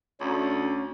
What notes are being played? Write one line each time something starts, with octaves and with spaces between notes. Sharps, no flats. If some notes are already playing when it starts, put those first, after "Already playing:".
D2 C#4